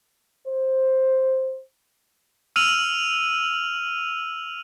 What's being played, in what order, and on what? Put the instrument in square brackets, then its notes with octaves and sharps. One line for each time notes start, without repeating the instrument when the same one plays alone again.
[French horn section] C5
[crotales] E6 F6 D#7 F7 F#7